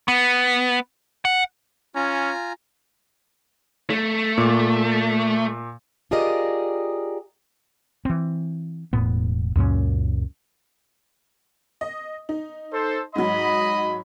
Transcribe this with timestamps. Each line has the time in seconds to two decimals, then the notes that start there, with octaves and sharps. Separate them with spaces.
0.08 B3
1.25 F#5
1.95 C#4 F4 G#5 A#5
3.90 A3
4.38 A#2 D6
6.11 F4 G4 G#4 A#4 D5 D#5
8.05 E3 C4
8.93 E1 A2 B3
9.56 C#2 F#2 A#2 C#4
11.81 D#5
12.29 D#4
12.72 A4 C5
13.16 G#2 F#3 D#5 B5